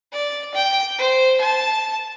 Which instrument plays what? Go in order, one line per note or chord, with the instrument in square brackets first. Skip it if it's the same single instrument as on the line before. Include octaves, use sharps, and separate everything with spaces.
[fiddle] D5
G5
C5
A5